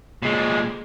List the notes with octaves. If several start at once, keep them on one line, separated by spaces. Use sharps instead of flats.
A#2 G#3